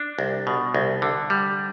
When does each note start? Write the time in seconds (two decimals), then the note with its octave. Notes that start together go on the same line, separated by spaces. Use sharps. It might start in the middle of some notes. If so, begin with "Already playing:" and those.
Already playing: D4
0.19 C2
0.47 B2
0.74 C2
1.02 D3
1.30 G3